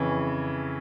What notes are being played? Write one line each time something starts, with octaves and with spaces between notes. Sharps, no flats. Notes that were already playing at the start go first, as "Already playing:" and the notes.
Already playing: F2 C#3 E3